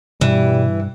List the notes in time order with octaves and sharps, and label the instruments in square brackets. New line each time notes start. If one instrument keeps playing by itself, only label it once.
[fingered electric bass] G2 [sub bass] B2 [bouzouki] E3 [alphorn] G3